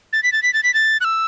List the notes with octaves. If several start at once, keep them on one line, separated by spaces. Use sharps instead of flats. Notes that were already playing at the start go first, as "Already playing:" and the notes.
A6
B6
A6
B6
A6
B6
A6
F#6
E6